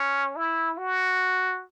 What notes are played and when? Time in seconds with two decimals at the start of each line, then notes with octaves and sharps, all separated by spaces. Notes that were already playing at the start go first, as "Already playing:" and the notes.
Already playing: C#4
0.36 E4
0.78 F#4